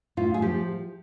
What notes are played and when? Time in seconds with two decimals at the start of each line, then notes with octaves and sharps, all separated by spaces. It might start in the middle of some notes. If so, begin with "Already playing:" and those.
0.17 A2 F4
0.34 G#4
0.42 F3 G4